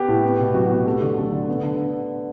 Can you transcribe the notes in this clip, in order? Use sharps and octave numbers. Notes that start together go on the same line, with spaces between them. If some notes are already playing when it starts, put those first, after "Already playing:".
Already playing: B3 G4
A2
B3
B2
F#3 F#4
F#4
B2
F#4
A3 G4
D3 G4
F#3 A4
D3
B3
D3